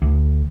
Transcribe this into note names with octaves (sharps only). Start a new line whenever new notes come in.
D2